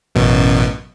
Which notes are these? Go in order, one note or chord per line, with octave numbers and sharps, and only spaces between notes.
A1 F#2 B2